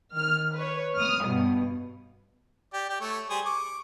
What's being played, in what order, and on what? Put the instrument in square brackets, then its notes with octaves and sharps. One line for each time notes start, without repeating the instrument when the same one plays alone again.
[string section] D#3 F6
B4 C#5
D#6 F6
G2 B2
[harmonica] G4 D5
G4 D5
A3 C#5
G3 G#4 C5
C#6 D6